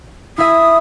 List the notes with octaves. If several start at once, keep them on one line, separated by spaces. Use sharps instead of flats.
E4 E5 D#6